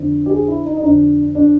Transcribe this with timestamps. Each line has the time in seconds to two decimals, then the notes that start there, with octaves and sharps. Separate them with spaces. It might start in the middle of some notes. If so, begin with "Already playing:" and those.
Already playing: F2 D3
0.26 G4
0.31 G#4
0.48 E4
0.65 D#4
0.77 D#4
0.83 F2 D3 D4
1.35 D4